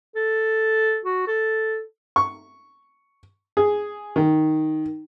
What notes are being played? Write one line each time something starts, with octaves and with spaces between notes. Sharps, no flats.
A4
F#4
A4
C#6
G#4
D#3